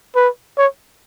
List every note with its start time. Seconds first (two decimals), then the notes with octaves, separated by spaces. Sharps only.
0.16 B4
0.58 C#5